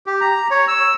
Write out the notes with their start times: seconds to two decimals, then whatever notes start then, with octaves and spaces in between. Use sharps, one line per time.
0.06 G4
0.21 A#5
0.51 C#5
0.68 E6